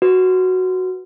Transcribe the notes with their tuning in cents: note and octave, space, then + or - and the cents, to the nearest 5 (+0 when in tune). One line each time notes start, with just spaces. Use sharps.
F#4 +0 B4 +0